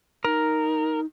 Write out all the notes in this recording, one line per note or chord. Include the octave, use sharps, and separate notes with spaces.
D#4 A#4